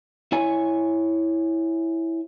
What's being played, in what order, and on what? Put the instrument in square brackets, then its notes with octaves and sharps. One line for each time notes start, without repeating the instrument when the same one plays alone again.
[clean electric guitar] E4 C#5 G#5